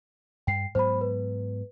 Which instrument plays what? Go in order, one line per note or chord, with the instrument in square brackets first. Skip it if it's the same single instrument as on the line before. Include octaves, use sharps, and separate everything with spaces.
[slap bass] G2 [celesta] G5 C7
[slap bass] G#2 F#3 B3 [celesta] C5 B5
[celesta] B4